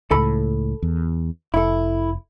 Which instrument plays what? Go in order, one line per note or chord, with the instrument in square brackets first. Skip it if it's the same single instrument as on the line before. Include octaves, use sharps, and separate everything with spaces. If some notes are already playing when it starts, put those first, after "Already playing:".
[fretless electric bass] C#2 A2 [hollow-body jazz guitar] A4 B5
[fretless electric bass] E2
[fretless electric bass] F1 [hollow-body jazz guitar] E4 A4